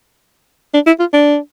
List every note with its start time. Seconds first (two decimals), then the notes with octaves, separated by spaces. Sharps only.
0.74 D4
0.86 E4
1.00 F4
1.13 D4